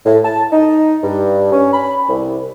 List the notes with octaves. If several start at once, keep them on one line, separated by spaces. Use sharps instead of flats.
A2
A5
D#4
G2
C#4
B5
C2